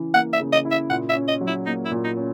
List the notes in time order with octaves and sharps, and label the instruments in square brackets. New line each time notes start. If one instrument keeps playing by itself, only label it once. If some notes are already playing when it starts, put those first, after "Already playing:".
Already playing: [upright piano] C#3 E3 E4
[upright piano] A#3 [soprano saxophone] F#5
[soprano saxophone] E5
[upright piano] C#3
[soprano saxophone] D#5
[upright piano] E4
[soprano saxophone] E5
[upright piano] A#2 [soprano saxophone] F#5
[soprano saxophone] E5
[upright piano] C#4
[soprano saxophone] D#5
[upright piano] F#3
[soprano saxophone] E4
[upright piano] A#3 [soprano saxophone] D#4
[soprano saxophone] E4
[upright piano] A#2
[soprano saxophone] D#4
[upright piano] C#4